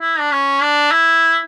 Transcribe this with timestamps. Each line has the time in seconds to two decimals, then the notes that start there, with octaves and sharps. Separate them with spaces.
0.01 E4
0.20 D4
0.32 C#4
0.62 D4
0.91 E4